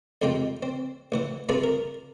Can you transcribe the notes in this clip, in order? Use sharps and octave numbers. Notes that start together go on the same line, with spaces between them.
F2 C3 G#3 F4 G5
C4
A1 E3 F#5
G2 C3 F4 G#4 B4 A5
A#4